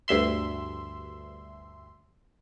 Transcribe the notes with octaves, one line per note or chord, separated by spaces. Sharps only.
D2 G2 E5 C6